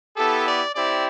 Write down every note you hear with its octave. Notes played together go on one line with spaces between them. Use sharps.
B3 E4 G4 A4
D5
C4 E4 G4 D5